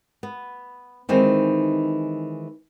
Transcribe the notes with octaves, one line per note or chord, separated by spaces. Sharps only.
B3
D#3 E3 G#3 C4 D#4